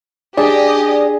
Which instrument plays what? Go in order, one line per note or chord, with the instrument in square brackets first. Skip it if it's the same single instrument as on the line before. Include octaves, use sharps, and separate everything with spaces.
[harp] D4 [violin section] G4 D#5 [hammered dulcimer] G#4 [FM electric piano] D5